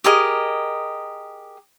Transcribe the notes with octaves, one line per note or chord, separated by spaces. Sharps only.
G4 G#4 A#4 D#5